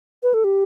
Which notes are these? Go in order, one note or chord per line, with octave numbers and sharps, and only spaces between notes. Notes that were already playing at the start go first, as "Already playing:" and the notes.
B4
A4
G4